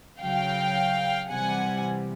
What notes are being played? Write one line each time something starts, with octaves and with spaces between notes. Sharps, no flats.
C#3 F#3 F5 G5
C3 E3 G3 F#5 G#5